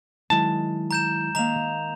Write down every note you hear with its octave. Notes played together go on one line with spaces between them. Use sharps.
D#3 F#3 G#3 E4 A5
A#5 G6 E7
D#3 A#3 A#5 F7